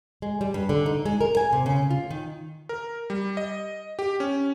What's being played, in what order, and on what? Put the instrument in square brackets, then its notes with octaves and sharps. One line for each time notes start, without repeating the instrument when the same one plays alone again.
[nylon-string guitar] G#3
G3
G2
D3
D#4
G#3
A#4
G#5
C3
C#3
F4
D#3
[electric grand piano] A#4
G3
D#5
G4
C#4